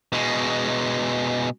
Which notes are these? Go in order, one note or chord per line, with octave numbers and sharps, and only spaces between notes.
B2 G#3